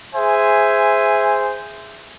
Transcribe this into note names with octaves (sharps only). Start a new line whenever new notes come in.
G#4 C5 E5 G#5